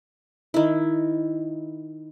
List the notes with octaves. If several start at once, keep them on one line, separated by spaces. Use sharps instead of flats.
D#3 E4